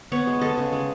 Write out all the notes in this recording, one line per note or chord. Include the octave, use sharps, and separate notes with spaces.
B3 C#5
G#3
G#3 A4
C#3
G#3